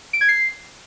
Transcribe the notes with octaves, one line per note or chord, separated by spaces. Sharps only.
D7
G#6
C7